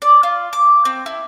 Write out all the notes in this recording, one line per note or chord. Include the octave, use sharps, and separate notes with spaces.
D5
F4
D6
C4
E4